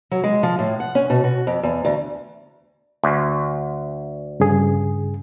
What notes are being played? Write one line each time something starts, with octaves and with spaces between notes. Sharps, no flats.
F#3
G#3
F3
A2
F#5
C#4
B2
F#4
F2
E2
D2
D2
G2 C#3 G#4